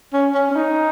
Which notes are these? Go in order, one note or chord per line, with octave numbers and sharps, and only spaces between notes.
C#4
C#4
C#4
D#4